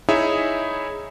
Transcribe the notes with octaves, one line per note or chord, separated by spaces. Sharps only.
D#4 E4 G#4 C#5 E5